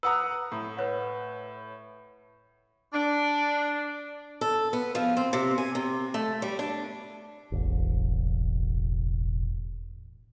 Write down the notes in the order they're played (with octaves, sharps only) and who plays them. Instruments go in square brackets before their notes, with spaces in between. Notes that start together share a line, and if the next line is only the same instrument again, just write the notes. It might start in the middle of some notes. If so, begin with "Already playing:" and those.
[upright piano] B4 F#5 A#5 [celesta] D#6 E6
[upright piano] A2
[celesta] B4 C#5 F#5
[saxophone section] D4
[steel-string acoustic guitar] A4
B3
F3
C4
C3
G#5
C3
A3
G3
D4
[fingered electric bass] E1 A1